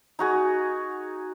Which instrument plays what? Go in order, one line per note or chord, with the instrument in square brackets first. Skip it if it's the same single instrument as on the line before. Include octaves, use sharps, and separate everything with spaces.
[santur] D#4 F#4 G#4